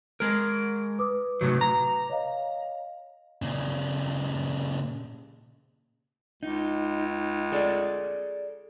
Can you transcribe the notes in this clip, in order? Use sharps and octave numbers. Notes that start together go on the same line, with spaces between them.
G#3 A#4
B4 D6 D#6
A2 C3 F#3
A#5
C#5 D#5 F5
A#2 C#3
C#2 D#4
G#4 A4 D5